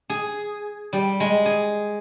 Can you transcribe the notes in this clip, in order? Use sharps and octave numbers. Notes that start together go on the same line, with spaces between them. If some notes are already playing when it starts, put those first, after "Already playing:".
G#4
G3
G#3
G#4